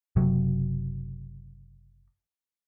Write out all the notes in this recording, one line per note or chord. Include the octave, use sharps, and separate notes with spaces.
F#1 C3 F#3